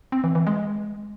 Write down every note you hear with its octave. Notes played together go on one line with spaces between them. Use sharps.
C4
E3
E3
G#3